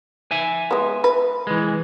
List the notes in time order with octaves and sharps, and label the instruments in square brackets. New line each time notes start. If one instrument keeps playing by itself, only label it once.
[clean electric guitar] E5 G#5
[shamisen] G#3 B3
B4
[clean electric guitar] E3 G#3